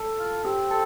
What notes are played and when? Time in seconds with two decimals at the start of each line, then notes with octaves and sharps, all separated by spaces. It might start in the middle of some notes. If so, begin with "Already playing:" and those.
Already playing: A4
0.19 F4
0.43 C4 G4
0.70 A4